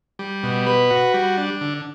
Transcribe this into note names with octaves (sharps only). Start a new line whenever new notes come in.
G3
B2
B4
F#4
G3
D4
D3